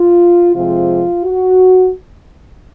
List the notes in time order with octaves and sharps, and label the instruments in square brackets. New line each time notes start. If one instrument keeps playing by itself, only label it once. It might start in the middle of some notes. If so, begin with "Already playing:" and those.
Already playing: [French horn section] F4
F2 C3 F3 G#3 F4
F#4